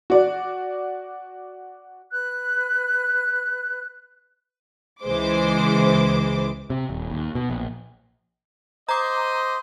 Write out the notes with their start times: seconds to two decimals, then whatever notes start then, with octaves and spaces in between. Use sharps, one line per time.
0.10 F#4 D5
2.11 B4 F#6
5.04 C#2 E3 G#3 C5 D6
6.70 C3
6.90 D#1
7.11 D#2
7.35 B2
7.50 A#1
8.89 C5 D#5 A#5 D6